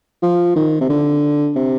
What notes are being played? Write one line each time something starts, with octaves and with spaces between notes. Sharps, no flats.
F3
D#3
C3
D3
C3